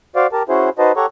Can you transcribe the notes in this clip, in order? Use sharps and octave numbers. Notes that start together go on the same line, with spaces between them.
F#4 C5 D5 F5
G4 A#4 A5
C#4 E4 F#4 G#4 C5
D#4 F#4 B4 C5 D#5 A5
G4 A4 C#5 F#5 A#5 C#6